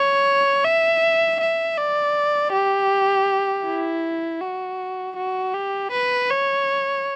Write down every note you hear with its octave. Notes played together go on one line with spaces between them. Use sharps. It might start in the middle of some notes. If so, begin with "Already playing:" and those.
Already playing: C#5
E5
E5
D5
G4
E4
F#4
F#4
G4
B4
C#5